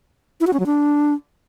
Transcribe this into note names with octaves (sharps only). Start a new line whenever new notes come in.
E4
F#4
C#4
F#3
D4